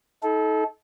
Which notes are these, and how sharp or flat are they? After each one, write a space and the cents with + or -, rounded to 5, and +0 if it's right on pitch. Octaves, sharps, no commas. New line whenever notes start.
D#4 +35 A4 -25